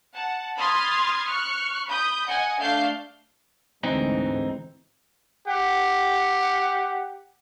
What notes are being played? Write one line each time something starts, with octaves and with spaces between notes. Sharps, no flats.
F#5 A5
B5 C6 D#6 F6 G#6 A6
C#6 F6 F#6
B5 D#6 G6
D#5 F#5 G#5
A3 D4 F5 A5 G6 C7
D2 G#2 E3 C4 D#4
G4 F#5